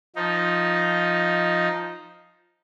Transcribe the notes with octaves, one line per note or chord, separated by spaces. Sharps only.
F3 D#4